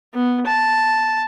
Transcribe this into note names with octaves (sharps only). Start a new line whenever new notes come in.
B3
A5